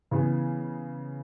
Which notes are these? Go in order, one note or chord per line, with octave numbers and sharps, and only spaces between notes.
C#3 E3 B3 G#4